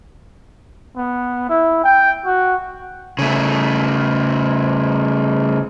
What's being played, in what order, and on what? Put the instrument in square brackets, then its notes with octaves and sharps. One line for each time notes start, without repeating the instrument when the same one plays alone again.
[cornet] B3
E4
G5
F#4
[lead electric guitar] C#3 A3